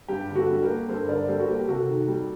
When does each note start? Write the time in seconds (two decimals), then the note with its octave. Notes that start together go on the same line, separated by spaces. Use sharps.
0.08 G2 G4
0.30 D3
0.35 F#4 A4
0.49 G3
0.62 G4 A#4
0.69 A#3
0.88 G2 A4 C5
1.08 D3 A#4 D5
1.28 G3 A4 C5
1.40 F#4
1.48 A#3 G4
1.59 G4
1.68 C3 F#4 A4
1.88 D#3
2.08 G3